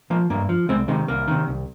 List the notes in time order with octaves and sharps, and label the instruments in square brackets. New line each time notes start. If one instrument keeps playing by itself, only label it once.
[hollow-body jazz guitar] F3 A#3
G2 A#3
F3
C2 G#3 C4
C3 D#3 G#3
C2 A#3
C3 D#3
C2